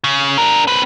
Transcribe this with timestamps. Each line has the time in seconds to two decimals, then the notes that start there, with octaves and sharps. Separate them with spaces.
0.04 C#3
0.38 D4 A#4
0.67 C4 B4